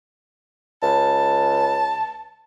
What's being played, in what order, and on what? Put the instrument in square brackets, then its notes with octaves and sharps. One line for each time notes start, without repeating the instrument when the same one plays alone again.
[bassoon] C#2 [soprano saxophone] A5